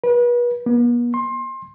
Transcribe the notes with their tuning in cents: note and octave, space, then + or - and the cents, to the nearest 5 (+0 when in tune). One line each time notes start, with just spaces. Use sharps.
B4 -35
B3 -45
C6 +25